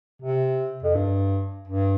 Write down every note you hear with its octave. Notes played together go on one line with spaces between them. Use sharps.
C3
F2
G2
G2